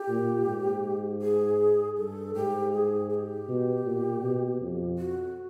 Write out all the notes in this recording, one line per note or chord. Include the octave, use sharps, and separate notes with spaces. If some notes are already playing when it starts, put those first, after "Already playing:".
Already playing: G4
A#2
G#2
G#4
G2 A4
G#2 G4
G#4
G#4
G4
B2
A#2
B2
F2
F#4